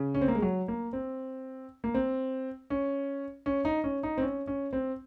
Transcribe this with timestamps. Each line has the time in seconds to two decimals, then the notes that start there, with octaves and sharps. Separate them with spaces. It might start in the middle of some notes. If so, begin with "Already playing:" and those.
Already playing: C#3
0.14 C#4
0.21 C4
0.28 A#3
0.35 G#3
0.42 F#3
0.68 A#3
0.93 C4
1.84 A#3
1.94 C4
2.70 C#4
3.46 C#4
3.65 D#4
3.84 C#4
4.03 D#4
4.18 C4
4.22 C#4
4.47 C#4
4.73 C4